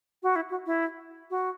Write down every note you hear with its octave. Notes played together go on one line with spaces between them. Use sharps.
F#4
E4
F#4
E4
F#4